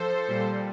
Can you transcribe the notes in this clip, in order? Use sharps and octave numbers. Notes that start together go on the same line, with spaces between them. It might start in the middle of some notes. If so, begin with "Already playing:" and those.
Already playing: F3 A4 C5
A#2 G3